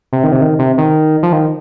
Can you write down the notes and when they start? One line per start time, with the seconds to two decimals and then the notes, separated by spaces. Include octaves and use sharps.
0.13 C3
0.24 D#3
0.32 C3
0.41 D#3
0.59 C3
0.78 D#3
1.23 F3
1.33 D#3